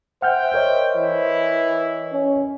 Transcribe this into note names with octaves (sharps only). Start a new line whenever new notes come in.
C5 E5 F#5 G5 F6 G6
A#4 C#5 D#5
E3 E4
C#4